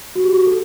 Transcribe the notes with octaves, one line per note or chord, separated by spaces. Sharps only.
F#4
G4
F#4
A4